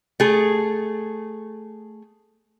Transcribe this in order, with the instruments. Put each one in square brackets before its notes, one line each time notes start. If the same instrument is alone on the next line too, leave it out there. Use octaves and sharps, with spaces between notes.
[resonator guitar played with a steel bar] A3 G#4